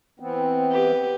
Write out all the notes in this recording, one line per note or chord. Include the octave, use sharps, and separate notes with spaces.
E3 B3 C4
G4 B4